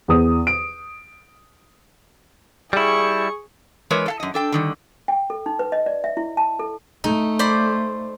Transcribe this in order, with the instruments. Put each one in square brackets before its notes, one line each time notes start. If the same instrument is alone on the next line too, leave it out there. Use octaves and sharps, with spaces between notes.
[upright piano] E2 D#6
D7
[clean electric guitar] G3 E4 [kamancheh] G#4 C#6
[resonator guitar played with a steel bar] E3 G#3 A#4 B4 C#5
A4 F5 A5
F#2 D#5
D4 A4 G5
D3 D#3 G3
[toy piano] G5
A4
D#4
B4
D#5
D5
E5
E4
A5
A4
[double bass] A3 [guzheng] D#4
[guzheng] C5 D5 B5